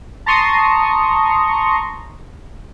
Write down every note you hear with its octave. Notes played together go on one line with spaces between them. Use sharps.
A5 A#5 C6 C#6 D#6